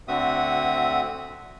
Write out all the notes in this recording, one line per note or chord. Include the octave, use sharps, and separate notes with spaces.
D2 D3 C4 F#4 E5 D#6